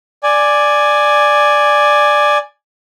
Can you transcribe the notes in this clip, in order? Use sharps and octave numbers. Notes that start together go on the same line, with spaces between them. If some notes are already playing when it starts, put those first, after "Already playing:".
D5 G#5